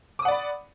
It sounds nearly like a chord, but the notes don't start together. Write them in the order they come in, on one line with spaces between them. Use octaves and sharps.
D6 D#6 F#5 D5 B5